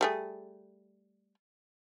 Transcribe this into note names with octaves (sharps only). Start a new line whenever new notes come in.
G3 A3 G#4